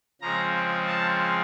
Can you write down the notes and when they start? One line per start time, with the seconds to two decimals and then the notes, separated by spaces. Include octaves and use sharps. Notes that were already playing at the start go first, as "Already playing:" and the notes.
0.21 C#3 F3 G#3 C4 A#5
0.87 A5